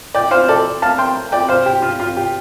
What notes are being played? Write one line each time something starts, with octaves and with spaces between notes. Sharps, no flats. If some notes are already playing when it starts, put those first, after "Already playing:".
D5 G5
C5 F5
A4 D5
F5 A5
G5 C6
D5 G5
C5 F5
G4
F4
F4
G4